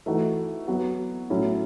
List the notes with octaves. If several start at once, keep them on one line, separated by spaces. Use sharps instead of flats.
E3 A3 D#4 F#4
F#3 B3 F#4
A2 F#3 C#4 E4